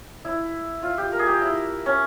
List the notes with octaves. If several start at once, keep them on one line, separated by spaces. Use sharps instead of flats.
E4
F4
G4
A#4
G#4
G4
E4
C#4